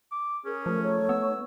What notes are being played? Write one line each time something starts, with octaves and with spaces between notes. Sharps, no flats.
D6
C#4 G#4 A#4
F3 A3
D#4 C#5 C#6
B3 E6